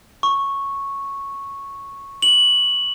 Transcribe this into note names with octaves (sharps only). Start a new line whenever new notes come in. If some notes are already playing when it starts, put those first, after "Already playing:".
C#6
F#7